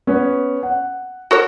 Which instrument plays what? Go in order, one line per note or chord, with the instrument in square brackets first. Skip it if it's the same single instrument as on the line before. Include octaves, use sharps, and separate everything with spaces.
[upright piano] B3 C#4
F#5
[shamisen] F#4 A#4 C#5